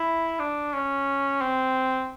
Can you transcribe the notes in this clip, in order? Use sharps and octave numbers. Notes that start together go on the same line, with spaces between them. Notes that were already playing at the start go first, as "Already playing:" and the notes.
Already playing: E4
D4
C#4
C4